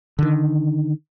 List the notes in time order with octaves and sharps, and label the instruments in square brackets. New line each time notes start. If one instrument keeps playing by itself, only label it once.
[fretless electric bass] D3 D#3